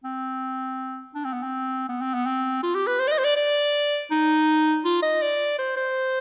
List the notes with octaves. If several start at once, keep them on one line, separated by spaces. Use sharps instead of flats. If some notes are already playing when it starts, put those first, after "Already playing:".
C4
D4
C4
B3
C4
B3
C4
B3
C4
F4
G4
B4
C5
D5
D#5
C5
D5
D5
D#4
F4
D#5
D5
C5
C5